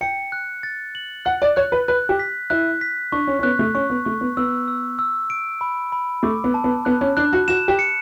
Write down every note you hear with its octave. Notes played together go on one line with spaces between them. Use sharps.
G5 C#7
F#6
A6
F#7
F#5 F#6
D5
C#5 F#6
B4
B4 F#6
G4
B6
E4 F#6
B6
D4 C#6
C#4
C#4
B3 F#6
A3
C#4 C#6
B3
A3 C#6
B3
B3 E6
E6
E6
D7
B5
B5
A3 D6
B3
A5
B3
B3 F#6
C#4
D4 F#6
F#4
F#4 E7
G4
C#7